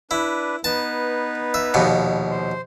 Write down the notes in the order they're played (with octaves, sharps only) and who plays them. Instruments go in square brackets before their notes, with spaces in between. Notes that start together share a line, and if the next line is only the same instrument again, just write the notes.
[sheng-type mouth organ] D4 B4 [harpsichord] E4
[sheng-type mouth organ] B3 D#4 B4 [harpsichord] A5
[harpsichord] E5
A#1 D#2 B2
[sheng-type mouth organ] C5